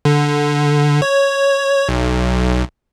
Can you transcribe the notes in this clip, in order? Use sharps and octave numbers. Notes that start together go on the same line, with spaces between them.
D3
C#5
B1